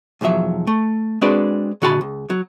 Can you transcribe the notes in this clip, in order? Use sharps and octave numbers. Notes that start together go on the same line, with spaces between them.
B1 E2 F3 F#3 E5
A3
G#3 C4 D4 F#4 B4 D5
A#2 D3 F#4 G#4 A5 B5
C#2
F#3